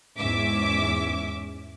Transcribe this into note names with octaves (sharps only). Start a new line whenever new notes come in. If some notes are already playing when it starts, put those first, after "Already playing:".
E2 G#2 C#4 E5 D6